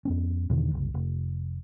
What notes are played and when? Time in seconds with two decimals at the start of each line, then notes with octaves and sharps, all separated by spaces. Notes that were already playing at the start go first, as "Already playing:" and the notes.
0.05 F2 B3 C#4
0.50 E2 B2 D3 D#3
0.71 F#1 C2
0.94 F1